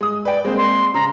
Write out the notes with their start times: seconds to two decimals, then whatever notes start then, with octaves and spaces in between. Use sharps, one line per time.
0.01 G#3 D#6
0.25 B4 D5 G5
0.45 G#3 A#3 C4 C5
0.57 C6
0.94 C#3 A#5